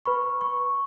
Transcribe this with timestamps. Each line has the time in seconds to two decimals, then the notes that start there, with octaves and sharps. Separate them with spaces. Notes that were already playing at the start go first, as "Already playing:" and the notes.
0.06 B4 B5 C#6
0.41 C#6